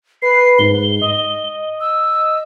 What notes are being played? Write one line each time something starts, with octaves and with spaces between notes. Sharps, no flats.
B4 C7
G#2 G7
D#5
E6